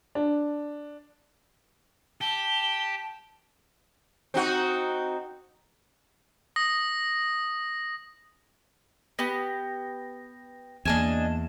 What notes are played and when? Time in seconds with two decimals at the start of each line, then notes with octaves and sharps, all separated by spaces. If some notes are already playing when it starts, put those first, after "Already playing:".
0.15 D4
2.21 G4 A5 G7
4.34 C4 D#4 F#4
6.56 D#6 A#6
9.19 B3 G4 A#6
10.85 E2 A#3 D4 D#5 G#5 A5 E7